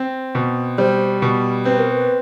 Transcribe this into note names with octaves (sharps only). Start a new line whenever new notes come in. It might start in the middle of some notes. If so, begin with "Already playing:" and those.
Already playing: C4
B2
G3 C5
B2
C4 B4
A#4
B4